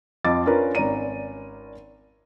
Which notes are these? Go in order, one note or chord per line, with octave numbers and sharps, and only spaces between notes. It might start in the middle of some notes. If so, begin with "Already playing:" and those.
F2 F4 D#5 D6 A6
C#4 D4 F4 A#4 B4
G#1 C#4 D5 A#5 D#7